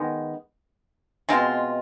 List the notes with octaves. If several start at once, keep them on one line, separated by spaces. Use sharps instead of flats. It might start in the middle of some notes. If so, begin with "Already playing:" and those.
Already playing: D#3 G#3 B3
B2 G#3 C4 F4